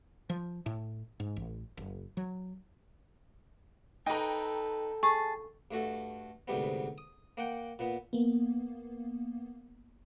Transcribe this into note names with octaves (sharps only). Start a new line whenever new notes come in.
F3
A2
G#2
A1
F#1
F#3
D#4 A4 B4 G5 A#5
G#4 A5 C#6
G2 A3 F#4 A4
D2 G#2 C3 G3 B3
D#6
A#3 F#5 G5
A#2 B3
A#3 B3